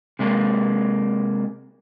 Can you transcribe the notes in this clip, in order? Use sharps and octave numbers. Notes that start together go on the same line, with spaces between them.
C3 G#3 A#3